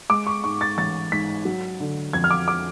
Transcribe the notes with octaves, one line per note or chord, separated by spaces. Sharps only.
G#3 D6
C#6
G#2 C#6
A6
A1 A6
G#2 B6
F#3
D3
F2 G#6
F6
D6
D6